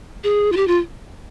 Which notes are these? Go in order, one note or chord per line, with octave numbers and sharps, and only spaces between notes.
G#4
F4
G4
F4